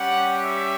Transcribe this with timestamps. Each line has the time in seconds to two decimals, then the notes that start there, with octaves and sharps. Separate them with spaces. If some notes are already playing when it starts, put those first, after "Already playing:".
Already playing: G3 C#4 G4 F#5
0.43 E5